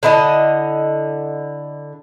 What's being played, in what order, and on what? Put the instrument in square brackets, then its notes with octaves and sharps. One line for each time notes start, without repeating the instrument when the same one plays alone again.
[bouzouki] D3 E4 D#5 A5